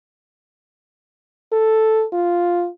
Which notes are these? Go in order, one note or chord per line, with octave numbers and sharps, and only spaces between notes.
A4
F4